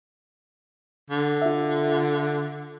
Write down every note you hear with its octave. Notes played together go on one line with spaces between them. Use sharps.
D3
F4 E5